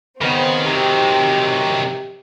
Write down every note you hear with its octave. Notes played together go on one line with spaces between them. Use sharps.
C#3 B3 C4 A#4 D#5
C3 F#3 G4